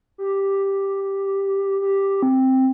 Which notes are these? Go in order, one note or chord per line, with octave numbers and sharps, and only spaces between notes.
G4
G4
C4